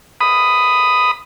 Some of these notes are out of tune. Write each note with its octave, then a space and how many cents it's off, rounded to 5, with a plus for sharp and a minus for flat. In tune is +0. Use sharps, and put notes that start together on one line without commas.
B5 +15 D#6 +0